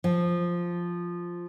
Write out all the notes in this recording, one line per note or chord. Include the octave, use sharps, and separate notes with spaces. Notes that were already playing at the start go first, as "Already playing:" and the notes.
F3